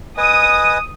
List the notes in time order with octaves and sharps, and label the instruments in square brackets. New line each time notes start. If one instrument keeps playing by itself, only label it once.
[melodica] B4 D#5 G#5 [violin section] D#6